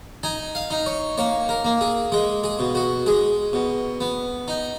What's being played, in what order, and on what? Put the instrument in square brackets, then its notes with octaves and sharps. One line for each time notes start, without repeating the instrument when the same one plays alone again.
[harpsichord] D#4 G#5
F5
D#4
C#5
A#3 C#5
A#4
A#3
G#4
G#3 G#4
G#4
B2
F#4
G#3 G#4
B2
B3
D#4